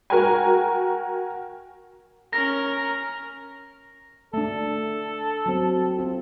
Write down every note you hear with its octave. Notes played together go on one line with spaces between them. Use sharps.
F#4 A#4 G5 G#5
C#4 A#4 A#6
A3 D4 A4
F#3 C4
C4 F4